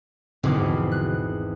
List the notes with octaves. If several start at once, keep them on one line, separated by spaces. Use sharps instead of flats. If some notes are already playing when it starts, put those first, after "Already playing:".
G#1 E2 B2 D3 F3 D6
F#6